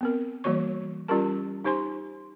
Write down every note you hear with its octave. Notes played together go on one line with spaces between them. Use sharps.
B3 C4 A#4
E3 G3 A#3 F#4 C#5 C#6
G3 C#4 F4 G4 A#4 A5
D#4 G4 C5 G#5 C6